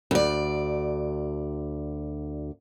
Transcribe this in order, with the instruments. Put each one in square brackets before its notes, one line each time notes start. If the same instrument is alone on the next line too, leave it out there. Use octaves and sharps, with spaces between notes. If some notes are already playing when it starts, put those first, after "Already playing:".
[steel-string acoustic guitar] D2 D5